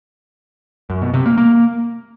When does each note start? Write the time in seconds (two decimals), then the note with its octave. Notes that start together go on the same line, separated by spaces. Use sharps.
0.90 F#2
1.02 B2
1.14 C3
1.26 A#3
1.38 A#3